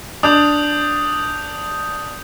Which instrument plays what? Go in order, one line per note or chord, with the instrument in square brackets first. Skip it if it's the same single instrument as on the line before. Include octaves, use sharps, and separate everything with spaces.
[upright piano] D4 [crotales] D#6 G6 F7